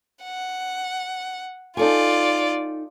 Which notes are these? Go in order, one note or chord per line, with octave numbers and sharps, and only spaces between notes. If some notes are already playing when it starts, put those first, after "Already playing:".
F#5
D#4 F4 A4 D5 G#5